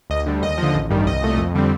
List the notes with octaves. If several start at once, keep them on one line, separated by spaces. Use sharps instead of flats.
D2 D#5
D3 G3
D#2 D#5
D3 F3
A1
G2 D#3 G3
C2 D#5
A#2 A3
F2
D3 G3 C4